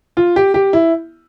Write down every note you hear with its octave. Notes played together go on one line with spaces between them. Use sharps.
F4
G4
G4
E4